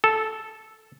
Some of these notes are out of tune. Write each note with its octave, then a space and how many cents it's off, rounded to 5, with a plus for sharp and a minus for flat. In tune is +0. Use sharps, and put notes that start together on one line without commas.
A4 -5